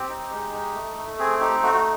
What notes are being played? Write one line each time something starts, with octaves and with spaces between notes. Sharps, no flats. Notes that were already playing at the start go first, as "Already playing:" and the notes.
Already playing: C4 G4
D#4
G#3
D#4
A3
A3
C4 G#4
D#4 G4
A3 F#4
F#4